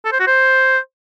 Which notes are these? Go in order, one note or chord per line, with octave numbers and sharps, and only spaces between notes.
A4
C5
F#4
C5